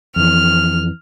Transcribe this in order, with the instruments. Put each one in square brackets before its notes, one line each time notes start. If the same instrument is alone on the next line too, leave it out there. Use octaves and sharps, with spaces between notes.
[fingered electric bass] F2 E3 [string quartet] F6